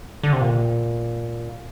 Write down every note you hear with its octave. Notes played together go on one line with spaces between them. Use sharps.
D3
C3
A#2